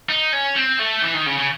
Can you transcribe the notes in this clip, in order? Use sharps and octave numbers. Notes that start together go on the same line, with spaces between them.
D#4
C#4
C4
A3
E3
D#3
C#3
C#3